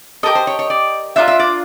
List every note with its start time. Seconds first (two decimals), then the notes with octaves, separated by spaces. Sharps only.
0.23 G4 A4 A#4 D#5
0.35 C5
0.47 C#5
0.59 C#5
0.70 D5
1.16 D4 F4 A#4 E5
1.28 E5
1.39 D5